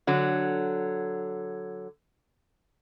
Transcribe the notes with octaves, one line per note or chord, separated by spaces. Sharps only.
D3 F#3